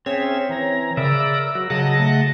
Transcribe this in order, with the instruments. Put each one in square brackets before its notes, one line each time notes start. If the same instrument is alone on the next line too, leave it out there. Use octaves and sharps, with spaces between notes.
[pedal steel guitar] C4 [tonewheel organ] C#4 G#4 E5 [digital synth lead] C#5
[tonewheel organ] E3 [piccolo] A#5
[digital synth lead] C#3 [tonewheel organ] A#4 D5 [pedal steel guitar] E5 B5 [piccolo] E6
[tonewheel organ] F#3 F#4
[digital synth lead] C#3 [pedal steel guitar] F#3 [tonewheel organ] D#5 F#5 A5 [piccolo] A#6
[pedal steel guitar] A3